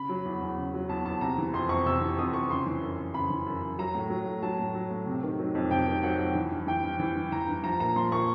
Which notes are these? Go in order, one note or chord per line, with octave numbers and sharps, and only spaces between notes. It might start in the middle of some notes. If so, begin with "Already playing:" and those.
Already playing: C#3 B5
F#3
E2
E2
C#3
F#3
E2 A5
E2 A5
C3 A#5
E3
F2 C6
F2 C#6
C3 E6
E3
F2 D#6
F2 C#6
C#3 C6
E3
F#2
F#2
C#3 B5
E3
F#2
F#2
F#3 A#5
A2
F#3
A2
F#3 A5
A2
F#3
A2
C3
D#3
F#3
F2
C3 G5
D#3
F#3 F#5
F2
E3
G2
E3 G5
G2
E3
G2
E3 A#5
G2
F3 A#5
A#2 A#5
F3 C6
A#2 C#6